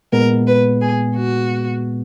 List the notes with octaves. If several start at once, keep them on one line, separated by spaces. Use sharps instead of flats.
A#2 G#3 B3 A#4
B4
G#4
F#4